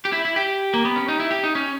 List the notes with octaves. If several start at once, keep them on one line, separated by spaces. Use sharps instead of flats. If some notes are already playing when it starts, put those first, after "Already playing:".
G4
E4
E4
G4
A#3
B3
C#4
D#4
E4
G4
D#4
C#4